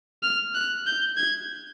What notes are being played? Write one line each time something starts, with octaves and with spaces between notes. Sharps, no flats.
F6
F#6
G6
G#6